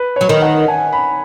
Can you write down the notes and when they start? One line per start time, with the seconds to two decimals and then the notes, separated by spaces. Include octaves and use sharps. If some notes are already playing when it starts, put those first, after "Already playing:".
Already playing: B4
0.16 F#3 C#5
0.29 D#3
0.42 F#5
0.68 G#5
0.93 B5